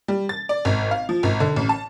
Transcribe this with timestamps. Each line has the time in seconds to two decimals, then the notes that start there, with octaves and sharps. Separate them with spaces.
0.08 G3
0.29 A6
0.49 D5
0.65 G#1
0.91 F5
1.09 F3
1.23 G#1
1.40 D3
1.56 A1
1.69 A5